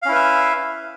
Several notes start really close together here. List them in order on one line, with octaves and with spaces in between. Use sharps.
F5 C#4 E4 B4 E5